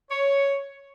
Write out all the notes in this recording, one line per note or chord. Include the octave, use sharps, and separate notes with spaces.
C#5